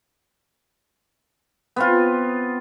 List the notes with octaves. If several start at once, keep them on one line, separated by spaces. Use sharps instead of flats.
B3 C4 F4